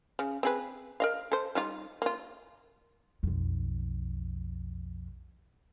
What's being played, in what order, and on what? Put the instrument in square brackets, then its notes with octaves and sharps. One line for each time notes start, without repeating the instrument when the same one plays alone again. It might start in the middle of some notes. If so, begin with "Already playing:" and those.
[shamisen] C#3
C4 G#4 B4
A#4 D#5 F5
A4 C5
G3 D#4 F4
A#3 F4
[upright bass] B1 F2